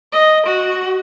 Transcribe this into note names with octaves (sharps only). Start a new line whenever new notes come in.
D#5
F#4